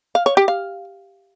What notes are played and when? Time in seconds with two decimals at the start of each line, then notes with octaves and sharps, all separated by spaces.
0.15 F5
0.26 C#5
0.37 G4
0.48 F5